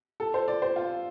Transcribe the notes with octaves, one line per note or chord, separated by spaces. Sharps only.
A4
C5
D5
C5
F4